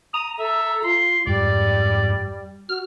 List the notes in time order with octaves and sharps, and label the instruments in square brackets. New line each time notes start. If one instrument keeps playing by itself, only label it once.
[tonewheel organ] A#5 [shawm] D#6
[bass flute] A4 [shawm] E5
[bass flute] F4 [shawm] C6
[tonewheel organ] F2 G#2 [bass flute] G3 [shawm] D5
[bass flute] F#4 [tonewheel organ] F6